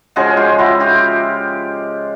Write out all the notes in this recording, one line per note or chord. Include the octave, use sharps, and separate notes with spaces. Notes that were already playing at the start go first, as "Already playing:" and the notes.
C#3 F3 G#3 F#4 G#4
F4 G4
E4 F#4
F4 G4